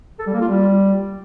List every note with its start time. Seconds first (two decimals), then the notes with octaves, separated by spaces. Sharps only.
0.19 A4
0.26 G3
0.34 A#3
0.41 F4
0.48 G3